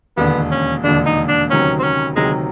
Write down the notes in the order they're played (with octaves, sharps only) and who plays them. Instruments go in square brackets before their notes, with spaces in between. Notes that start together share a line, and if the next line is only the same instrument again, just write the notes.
[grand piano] E1 D#2 D3 [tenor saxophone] B3
[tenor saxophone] C#4
[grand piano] E1 D#2 D3 [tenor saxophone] D4
[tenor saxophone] D#4
D4
[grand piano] D2 C3 D#3 F#3 [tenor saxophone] C#4
[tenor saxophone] C4
C#4
[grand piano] D2 C3 D#3 F#3 [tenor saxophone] G#3